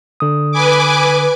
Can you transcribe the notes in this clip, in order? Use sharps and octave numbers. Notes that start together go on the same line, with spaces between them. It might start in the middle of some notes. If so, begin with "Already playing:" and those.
D3 D#6
B4 G#5 D6